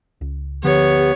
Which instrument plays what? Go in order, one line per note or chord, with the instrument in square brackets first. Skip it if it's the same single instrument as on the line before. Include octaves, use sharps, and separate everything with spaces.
[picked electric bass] C#2
[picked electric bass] D2 D3 F3 [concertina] B3 [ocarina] G4 [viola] C#5